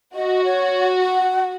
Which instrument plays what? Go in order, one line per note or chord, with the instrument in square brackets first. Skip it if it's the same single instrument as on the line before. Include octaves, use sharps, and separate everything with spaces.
[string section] F#4 [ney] D#5
[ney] C#5
F#5